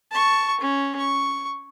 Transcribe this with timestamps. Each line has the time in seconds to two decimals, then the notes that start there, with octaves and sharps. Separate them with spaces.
0.11 A5 C#6
0.60 C#4
0.99 C#6